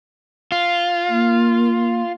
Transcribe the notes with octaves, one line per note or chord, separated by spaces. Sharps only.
F4
A#3